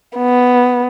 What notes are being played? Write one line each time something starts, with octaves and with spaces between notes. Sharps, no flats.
B3